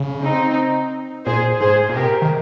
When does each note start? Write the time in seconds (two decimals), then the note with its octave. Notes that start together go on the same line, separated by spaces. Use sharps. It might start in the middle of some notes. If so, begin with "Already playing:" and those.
Already playing: C#3
0.21 C4 D#4
1.26 A#2 G#4 C5
1.60 G#2 G#4 C5
1.89 A#2
1.95 C3 G4 A#4
2.22 D#3